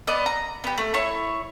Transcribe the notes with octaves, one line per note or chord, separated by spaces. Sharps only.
B3 D5 D#5
A#5
B3 G4
A3
E4 C#5 C#6